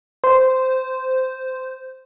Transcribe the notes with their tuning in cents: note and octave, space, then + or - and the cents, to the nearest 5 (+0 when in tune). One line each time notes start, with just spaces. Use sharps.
C5 -10